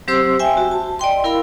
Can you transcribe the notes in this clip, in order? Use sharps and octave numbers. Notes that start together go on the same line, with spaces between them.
F#3 C4 G4 C5 C6 E6
E5 G5 G#5
F#4
A5
D5 D#5 G5 C6
E4 A#4 F5 B5 E6